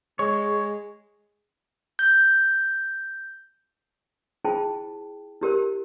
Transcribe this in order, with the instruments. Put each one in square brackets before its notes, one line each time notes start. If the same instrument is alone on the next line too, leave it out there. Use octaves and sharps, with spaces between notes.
[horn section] G#3 [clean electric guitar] C#5
[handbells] G6
[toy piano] E4 F4 G#4 C5 G5 A5
E4 G4 A#4 C5